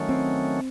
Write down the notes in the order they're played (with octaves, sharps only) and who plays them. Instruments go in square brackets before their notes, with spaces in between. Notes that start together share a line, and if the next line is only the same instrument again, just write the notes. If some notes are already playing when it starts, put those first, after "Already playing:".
Already playing: [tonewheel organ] D#3 F#3 A3 C#4
[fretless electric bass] C4